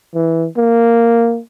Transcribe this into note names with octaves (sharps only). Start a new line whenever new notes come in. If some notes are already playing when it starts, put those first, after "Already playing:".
E3
A#3